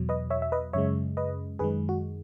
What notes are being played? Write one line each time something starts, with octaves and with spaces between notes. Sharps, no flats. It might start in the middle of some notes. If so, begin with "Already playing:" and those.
Already playing: E2 B2 F#3
B4 D#5
C#5 E5
E5
B4 D#5
F#2 C#3 G#3 C#5 E5
B4 D#5
F#2 D#3 G#3 G#4 B4
F#4